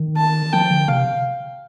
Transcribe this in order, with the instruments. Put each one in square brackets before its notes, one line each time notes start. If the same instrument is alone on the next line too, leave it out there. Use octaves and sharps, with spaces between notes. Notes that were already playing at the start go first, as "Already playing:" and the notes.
Already playing: [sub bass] D#3
[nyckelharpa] A5
[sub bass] F3 [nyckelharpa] G5
[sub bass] D3
[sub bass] C3 [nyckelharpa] F5